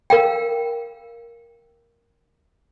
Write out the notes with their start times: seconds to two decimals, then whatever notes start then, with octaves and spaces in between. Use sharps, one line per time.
0.10 A#4 F5 G5